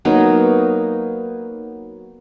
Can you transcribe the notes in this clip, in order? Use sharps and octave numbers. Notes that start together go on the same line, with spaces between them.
F#3 A#3 B3 D#4